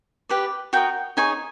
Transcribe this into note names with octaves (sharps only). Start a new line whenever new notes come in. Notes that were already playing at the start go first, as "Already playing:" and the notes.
G4 B4 D5
F#4 A#4 D#5 G5
D#4 G#4 C#5 G#5